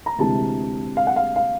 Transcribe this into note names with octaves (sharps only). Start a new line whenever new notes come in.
A#5
D2 C3 E3 G#3 A5
F5
F#5
F5
F5